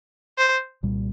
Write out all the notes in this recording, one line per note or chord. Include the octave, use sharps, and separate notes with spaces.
C5
C2 A#2 G3